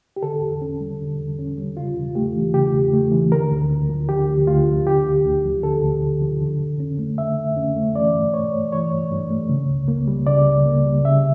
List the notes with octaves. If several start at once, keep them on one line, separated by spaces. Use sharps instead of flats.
G4
D3 A4
E2
C#4
G3
D3
E2
C#4
G3
C#3 F4
E2
A3 G4
E3
C#3 G4
E2
A3
E3
D3 A#4
D2
D2
F3
D3 G4
D2
D2 F4
F3
D3 G4
D2
D2
F3
D3 A4
D2
D2
F3
D3
F2
C#4
A3
D3 E5
F2
C#4
A3
E3 D5
G2
G2 C#5
A3
E3 C#5
G2
G2
A3
C#3
C#2
A#3
G3
C#3 D5
C#2
A#3
G3
C#3 E5